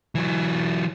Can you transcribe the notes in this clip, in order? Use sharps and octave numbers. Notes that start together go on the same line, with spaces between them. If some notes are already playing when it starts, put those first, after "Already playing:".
E3 F#3